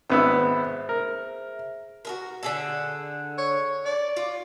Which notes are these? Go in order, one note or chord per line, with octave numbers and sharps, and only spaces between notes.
G#1 B3 G#4 C5 E5 E6
A#4
F#4 G#4 A#4
D3 G#4 A4
C#5
D5
F4